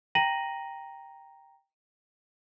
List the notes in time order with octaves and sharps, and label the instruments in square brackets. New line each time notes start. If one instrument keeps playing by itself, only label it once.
[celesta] G5 A#5 A#6 D#7 F#7